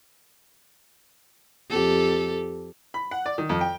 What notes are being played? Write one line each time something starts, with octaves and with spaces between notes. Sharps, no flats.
F2 G4 A4
B5
F#5
D5
D#3
F2
G5